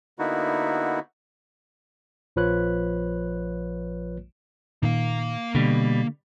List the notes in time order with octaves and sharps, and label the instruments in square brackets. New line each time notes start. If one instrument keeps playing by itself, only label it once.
[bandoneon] D3 A#3 B3 D#4 E4 F#4
[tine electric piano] A#1 F3 F4 B4 C#5 F#6
[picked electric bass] A#2 D#3 [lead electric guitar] A#3 F5
[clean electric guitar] B2 G3 [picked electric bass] D3